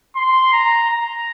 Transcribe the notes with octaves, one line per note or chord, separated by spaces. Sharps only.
C6
A#5
A#5